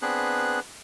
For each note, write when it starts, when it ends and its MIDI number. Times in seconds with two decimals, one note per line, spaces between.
0.02 0.60 59
0.02 0.60 60
0.02 0.60 62
0.02 0.60 68
0.02 0.60 71
0.02 0.60 90